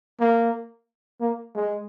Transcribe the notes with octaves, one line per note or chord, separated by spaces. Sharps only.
A#3
A#3
G#3